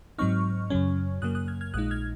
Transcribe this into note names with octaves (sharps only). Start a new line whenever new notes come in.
G#2 F#3 C4 D#4 C#6 F6
F#2 C#3 F#3 C#4
F#2 C#3 F#3 A#3 D#6 F#6
D#6 F#6
F6 G#6
F6 G#6
A#1 A#2 G#3 D#4 D#6 F#6
F6 G#6